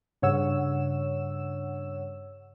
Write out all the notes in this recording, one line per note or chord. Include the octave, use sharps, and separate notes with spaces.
G2 C#3 C#5 F#5 E6 E7